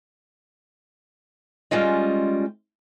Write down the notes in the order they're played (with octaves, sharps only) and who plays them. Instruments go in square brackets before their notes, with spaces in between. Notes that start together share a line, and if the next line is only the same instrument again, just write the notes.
[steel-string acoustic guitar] G3 G#3 C#4 F4 D#5